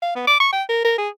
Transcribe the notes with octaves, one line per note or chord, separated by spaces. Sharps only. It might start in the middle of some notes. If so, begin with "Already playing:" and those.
F5
B3
D6
C#6
G5
A#4
A#4
G#4